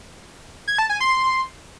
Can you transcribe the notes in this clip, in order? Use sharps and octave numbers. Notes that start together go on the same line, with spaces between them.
G#6
A5
G#5
C6